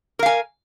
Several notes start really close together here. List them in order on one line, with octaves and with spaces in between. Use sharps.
A#4 F5 G#5